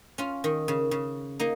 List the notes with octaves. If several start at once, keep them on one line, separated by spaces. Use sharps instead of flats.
C#4 F4
D#3
C#3
C#3
A#3 D#4